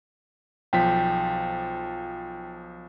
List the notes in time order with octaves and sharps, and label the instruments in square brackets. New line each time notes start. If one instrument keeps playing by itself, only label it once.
[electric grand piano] B1 F3 B6 [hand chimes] G5